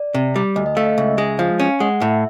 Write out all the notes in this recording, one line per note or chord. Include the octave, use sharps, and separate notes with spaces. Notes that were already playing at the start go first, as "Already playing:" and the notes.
Already playing: D5
C3
G3
D2 D#5
D#5
A3 F5
D#5
C#2 E5
G#3
F3 F5
C#4
G#3 F#5
A2 E5